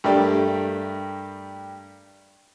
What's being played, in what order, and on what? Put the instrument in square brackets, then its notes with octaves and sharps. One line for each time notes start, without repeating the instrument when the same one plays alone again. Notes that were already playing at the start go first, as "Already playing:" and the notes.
[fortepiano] G2 A3 G4 A#4 D5